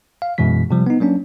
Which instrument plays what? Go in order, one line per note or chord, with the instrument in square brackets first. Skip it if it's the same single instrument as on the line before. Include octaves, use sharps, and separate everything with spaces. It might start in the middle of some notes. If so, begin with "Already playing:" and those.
[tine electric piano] F5
F#2 B2 E3 G#3 B6
C3 F3 G3
B3 D#4
F#3 A#3 C#4 D4